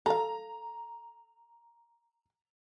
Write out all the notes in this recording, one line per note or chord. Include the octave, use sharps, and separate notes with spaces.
A4 F5 A#5